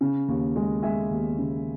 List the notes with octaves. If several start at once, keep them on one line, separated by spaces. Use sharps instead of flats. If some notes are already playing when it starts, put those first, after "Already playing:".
C#3
D#2
G#3
G#3 E5 G#5
D#2
C#3